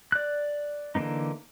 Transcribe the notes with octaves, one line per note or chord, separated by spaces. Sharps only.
D5 F#6
D3 E3 A#3 B3 D#4